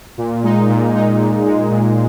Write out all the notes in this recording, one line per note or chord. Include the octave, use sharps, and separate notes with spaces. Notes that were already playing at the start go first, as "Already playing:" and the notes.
A#2
G#3 D#4
A#2
G#3 D#4
A#2
G#3 D#4
A#2